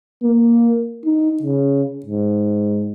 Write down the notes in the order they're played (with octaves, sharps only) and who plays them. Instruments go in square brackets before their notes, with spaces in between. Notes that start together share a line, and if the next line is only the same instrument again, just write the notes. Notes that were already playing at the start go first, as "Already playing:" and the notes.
[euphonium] A#3
D#4
C#3
G#2